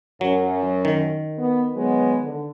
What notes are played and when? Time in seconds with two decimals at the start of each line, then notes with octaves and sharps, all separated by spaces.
0.21 F#2 F#3
0.85 D#3
1.38 B3
1.75 F#3 G#3 B3
2.22 D3